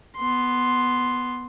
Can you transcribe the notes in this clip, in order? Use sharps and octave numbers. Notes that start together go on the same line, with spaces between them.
B3 C6